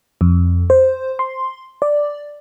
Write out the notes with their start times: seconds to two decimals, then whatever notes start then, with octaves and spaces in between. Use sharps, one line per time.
0.21 F2
0.70 C5
1.19 C6
1.82 D5